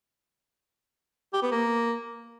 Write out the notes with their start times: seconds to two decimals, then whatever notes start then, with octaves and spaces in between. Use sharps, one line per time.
1.33 G4
1.42 B3
1.51 A#3